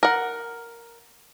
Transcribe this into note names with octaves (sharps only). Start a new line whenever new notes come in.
A#4 F#5